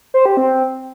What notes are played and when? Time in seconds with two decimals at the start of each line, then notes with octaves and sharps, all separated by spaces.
0.14 C5
0.26 G4
0.37 C4